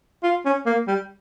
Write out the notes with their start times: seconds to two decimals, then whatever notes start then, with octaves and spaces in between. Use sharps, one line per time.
0.23 F4
0.45 C#4
0.66 A#3
0.87 G3